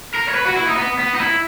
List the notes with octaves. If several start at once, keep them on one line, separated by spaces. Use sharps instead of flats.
A#4
C#5
B4
F#4
E4
D#4
B3
B3
D#4
E4